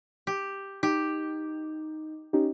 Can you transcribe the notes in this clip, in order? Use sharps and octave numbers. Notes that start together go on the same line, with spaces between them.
G4
D#4 G4
C#4 D#4 G4